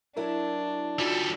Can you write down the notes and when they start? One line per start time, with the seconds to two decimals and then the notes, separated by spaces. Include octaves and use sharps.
0.17 F#3 D4 E4 A#4
0.99 G3 D4 D#4 F4 F#4 A4